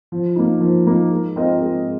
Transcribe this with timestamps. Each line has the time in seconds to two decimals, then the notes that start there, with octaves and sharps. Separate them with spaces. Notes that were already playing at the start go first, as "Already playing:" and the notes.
0.12 F3
0.36 A#3 D#4
0.61 F3
0.87 A#3 D#4
1.11 G#3
1.36 C4 F4 A#4 D#5
1.61 G#3